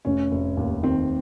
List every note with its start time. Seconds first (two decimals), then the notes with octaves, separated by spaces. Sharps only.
0.05 F1 C#4
0.31 F1
0.57 D#2
0.83 D#3 C4